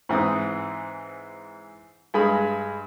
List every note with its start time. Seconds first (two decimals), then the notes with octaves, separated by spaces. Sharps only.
0.09 G#2 E3 C4 D#6
2.14 G2 G#3 G#4 B5